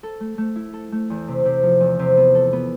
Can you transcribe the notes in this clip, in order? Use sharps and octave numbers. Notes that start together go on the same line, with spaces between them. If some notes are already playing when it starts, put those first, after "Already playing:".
A4
A3
A3
E4
A4
A3
E2
C3
C3
F3
E2
C3
B3
A4
B3